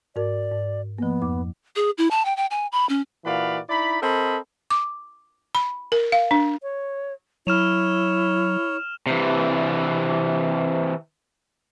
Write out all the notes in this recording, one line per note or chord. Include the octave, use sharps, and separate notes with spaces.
G#2 F#4 A#4 D5
G#2
F3 A#3 B3
F2 D6
G#4
E4
A5
G5
G5
G#5
B5
C#4
A#2 E3 F#4 D5 F5 B5
D#4 E4 D5 B5
C4 A4 A#4 D#5 A5 B5
D6
B5
A#4
F5
D4
C#5
F#3 E4 C#5 F6 E7 F7
C3 E3